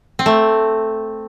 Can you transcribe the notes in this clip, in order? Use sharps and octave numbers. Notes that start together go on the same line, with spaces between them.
C4
A3